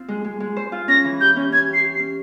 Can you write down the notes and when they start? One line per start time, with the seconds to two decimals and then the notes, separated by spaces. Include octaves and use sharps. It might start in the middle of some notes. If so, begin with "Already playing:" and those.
Already playing: C4 F4
0.08 G#3
0.24 G#3
0.40 G#3
0.57 C5
0.72 F4
0.88 C#4 A#6
1.05 E3
1.20 G4 G6
1.36 C#4
1.52 C#4 G#6
1.68 G4
1.74 C7
1.84 G4
1.95 C7
2.00 C#4